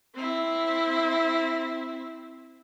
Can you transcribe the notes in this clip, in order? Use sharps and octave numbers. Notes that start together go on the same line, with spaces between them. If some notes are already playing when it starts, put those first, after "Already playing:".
C4 E4